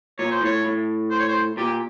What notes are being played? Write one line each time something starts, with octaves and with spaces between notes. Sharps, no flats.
A#2 C#5
C5
A2 C#5
A2
C5
C#5
C5
A#2 G4